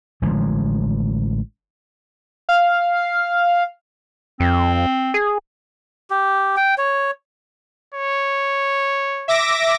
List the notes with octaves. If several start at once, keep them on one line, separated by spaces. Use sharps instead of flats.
A1 D3 F3 G#3
F5
F2 C4
G#4
G4
G5
C#5
C#5
E5 D6 A#6